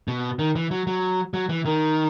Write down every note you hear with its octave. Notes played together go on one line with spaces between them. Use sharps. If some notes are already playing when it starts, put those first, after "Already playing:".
B2
D#3
E3
F#3
F#3
F#3
E3
D#3